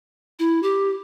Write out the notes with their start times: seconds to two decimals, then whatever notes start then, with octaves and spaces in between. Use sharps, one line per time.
0.39 E4
0.63 G4